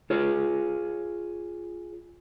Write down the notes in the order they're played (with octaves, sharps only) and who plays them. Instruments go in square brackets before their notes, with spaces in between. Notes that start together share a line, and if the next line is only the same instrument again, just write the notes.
[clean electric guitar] F4 G#4 C#5